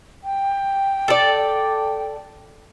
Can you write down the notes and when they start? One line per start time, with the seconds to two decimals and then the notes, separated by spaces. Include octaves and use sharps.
0.24 G5
1.08 A4 D5